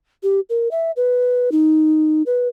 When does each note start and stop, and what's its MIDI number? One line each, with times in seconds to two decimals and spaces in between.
0.23 0.40 67
0.49 0.68 70
0.71 0.91 76
0.96 1.50 71
1.52 2.22 63
2.26 2.48 71